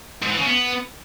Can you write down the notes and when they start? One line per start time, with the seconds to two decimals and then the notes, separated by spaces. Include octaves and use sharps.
0.22 G#2
0.30 E3
0.38 C#3
0.46 B3